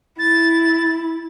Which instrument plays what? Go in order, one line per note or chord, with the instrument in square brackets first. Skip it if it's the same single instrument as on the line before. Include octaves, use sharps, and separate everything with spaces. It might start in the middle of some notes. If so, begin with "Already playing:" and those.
[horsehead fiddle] E4 [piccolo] A6